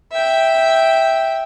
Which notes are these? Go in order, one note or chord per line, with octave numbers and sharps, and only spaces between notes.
E5 G5